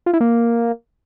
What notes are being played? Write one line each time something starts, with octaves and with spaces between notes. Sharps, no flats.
F4
E4
A#3